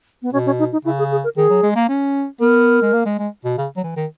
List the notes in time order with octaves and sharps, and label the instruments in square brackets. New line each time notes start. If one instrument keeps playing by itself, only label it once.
[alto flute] B3
[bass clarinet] B2 [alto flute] C#4
[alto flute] C#4
D#4
D#4
[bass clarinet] C#3 [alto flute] E4
[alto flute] G#4
G#4
A#4
[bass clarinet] D#3 [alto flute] G#4
[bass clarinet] F#3
G#3
A#3
C#4
[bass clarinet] B3 [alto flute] A#4
[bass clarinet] G#3
A#3
G#3
G#3
B2
C#3
F#3
E3
D#3